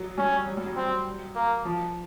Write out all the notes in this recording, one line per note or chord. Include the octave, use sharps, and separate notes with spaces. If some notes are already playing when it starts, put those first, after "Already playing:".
Already playing: F#3
G3 C#4
F#3
G3
F#3
F#3 C4
A#3
F3